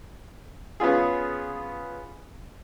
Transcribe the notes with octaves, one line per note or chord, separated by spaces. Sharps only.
B3 C#4 F4 G#4